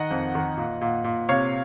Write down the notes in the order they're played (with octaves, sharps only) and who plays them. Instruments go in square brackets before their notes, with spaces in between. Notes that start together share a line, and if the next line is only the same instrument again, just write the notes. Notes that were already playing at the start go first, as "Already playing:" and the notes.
Already playing: [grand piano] D#3 D#5 F#5
F2
D#3
A#2
A#2
A#2
C3 C#5 F5